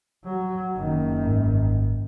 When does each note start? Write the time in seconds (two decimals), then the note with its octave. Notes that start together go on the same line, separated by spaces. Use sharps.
0.24 F#3
0.76 F#1 D#3
1.26 G#1